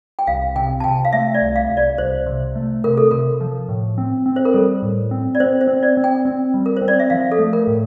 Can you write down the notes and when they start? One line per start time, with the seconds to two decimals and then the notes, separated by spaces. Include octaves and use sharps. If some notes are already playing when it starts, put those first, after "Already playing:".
0.19 G5
0.27 C2 F5
0.56 C3 G5
0.80 A5
0.84 C3 G5
1.05 F5
1.13 A3 E5
1.35 D5
1.41 C2
1.56 F5
1.70 C2
1.77 D5
1.98 C2 C5
2.26 C3
2.56 A3
2.84 C3 A#4
2.98 A4
3.11 C3 A#4
3.41 F3
3.69 A2
3.98 C4
4.26 C4
4.36 C5
4.45 A#4
4.54 G3 A4
4.82 A2
5.11 C4
5.35 D5
5.40 C4 C5
5.61 C5
5.67 C4
5.83 D5
5.97 C4
6.04 G5
6.25 C4
6.54 G3
6.66 A#4
6.77 C5
6.82 C4
6.88 D5
6.99 E5
7.10 F3 F5
7.32 A4
7.39 A3
7.53 A#4
7.67 A2